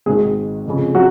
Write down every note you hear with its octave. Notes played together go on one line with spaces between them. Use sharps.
G#1 G#2 D#3 G#3 G#4
F1 F2 C#3
F#3 F#4